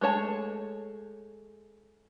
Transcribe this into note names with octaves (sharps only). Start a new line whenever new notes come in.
G#3 A3 C#5 A5